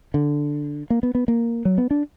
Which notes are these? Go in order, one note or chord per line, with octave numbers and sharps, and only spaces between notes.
D3
A#3
B3
B3
A#3
F#3
B3
D4